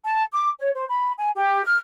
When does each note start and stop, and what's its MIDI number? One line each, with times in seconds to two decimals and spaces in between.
0.04 0.22 81
0.31 0.49 86
0.59 0.69 73
0.74 0.84 72
0.87 1.12 83
1.17 1.28 80
1.34 1.62 67
1.64 1.78 89